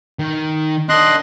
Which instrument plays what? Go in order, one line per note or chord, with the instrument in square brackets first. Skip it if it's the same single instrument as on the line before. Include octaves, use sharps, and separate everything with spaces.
[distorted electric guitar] D#3
[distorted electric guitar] D4 A#4 [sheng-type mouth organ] D#5 C6 F#6